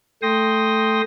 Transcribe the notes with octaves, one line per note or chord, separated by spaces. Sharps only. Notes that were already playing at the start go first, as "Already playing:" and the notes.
A3 G5 C6 D#6 A#6